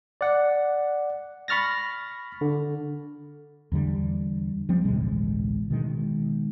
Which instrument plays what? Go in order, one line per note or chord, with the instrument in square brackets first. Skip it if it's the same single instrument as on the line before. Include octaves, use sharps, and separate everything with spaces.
[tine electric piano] D5 F#5
B5 C#6 F6 A6 A#6
D3
[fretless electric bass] E2 D3 G3
F3 G3 C4
A1 D2 B2 G#3
B2 D#3 G#3